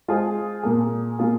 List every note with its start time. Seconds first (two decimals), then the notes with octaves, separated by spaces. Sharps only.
0.08 G#3 F4 G#4 C5
0.63 A#2 A#3 G#4
1.19 A#2 A#3 F4 G#4